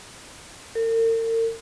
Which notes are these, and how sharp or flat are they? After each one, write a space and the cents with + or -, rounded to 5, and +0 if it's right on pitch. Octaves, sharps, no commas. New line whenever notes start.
A#4 -45